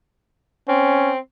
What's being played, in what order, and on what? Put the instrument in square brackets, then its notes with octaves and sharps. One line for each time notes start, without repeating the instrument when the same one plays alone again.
[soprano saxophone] C4 [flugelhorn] C#4